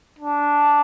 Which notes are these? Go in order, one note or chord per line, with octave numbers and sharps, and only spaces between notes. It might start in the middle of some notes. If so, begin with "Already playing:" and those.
D4